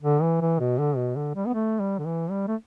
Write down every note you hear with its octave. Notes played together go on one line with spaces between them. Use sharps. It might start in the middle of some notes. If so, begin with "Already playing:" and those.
D3
E3
E3
B2
D3
B2
D3
G3
B3
A3
G3
D3
E3
G3
A3